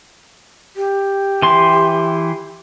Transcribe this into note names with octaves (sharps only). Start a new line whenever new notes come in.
G4
E3 C6